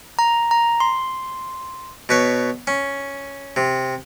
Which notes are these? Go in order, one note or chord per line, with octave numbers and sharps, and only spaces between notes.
A#5
A#5
C6
B2 B4 C#5
C#4
C3